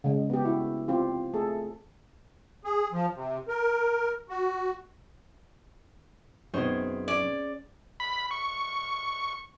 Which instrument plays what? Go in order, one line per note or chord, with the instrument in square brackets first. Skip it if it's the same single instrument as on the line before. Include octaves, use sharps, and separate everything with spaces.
[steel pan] C#3 G#3
B3 G4
E4 F#4
C4 F4 G4
A3 G#4 A4
[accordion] G#4
F3
C3
A#4
F#4
[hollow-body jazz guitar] F#2 B2 [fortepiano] D#3 B3 C4 [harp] G#4 C5 C#5
[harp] C#4 [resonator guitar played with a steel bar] D5
[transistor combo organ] B5
C#6